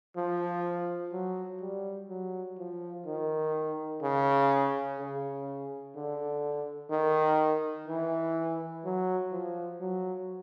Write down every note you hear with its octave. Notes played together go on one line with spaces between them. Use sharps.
F3
F#3
G3
F#3
F3
D#3
C#3
C#3
D3
D#3
E3
F#3
F3
F#3